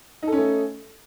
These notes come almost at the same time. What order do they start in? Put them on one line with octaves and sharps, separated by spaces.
D#4 A4 C#4 A3